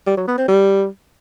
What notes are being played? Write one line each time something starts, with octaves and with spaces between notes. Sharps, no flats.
G3
F#3
B3
C4
G3